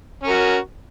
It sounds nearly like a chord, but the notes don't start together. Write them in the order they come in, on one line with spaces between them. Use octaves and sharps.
C#4 A#4 F#4